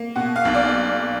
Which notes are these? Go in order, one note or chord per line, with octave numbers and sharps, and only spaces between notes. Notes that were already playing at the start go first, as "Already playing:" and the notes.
Already playing: A#3
B2 F#5
F5
B1
D5